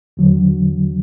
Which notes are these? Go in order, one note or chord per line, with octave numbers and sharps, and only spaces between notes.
E2 D3 F#3